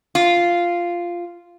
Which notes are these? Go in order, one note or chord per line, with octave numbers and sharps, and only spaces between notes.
F4